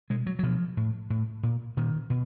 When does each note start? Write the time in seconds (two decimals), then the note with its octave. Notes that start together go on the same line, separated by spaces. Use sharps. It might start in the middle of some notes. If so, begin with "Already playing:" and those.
0.10 B2 G#3
0.26 F#3
0.39 F#3
0.43 B2 F3
0.77 A2
1.10 A2
1.43 A#2
1.77 A#2 D#3
2.10 B2